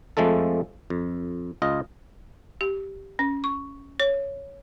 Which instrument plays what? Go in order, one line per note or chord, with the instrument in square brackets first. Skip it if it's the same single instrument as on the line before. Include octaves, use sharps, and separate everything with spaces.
[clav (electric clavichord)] F2 F3 G#3 A3 A4
F2
C#2 F4 D#5
[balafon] G4
C#4
C#6
C#5